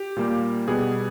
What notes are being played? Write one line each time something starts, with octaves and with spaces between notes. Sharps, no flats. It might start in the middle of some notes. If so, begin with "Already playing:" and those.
Already playing: G4
A#2 G3 A#3
B2 G3 B3 G#4